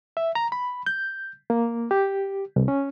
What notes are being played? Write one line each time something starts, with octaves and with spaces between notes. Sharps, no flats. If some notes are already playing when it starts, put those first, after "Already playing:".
E5
A#5
B5
G6
A#3
G4
C2
C#4